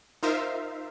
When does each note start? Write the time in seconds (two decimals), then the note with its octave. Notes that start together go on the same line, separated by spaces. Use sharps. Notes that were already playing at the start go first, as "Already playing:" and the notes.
0.23 D#4 F4 A#4 C5 E5 F5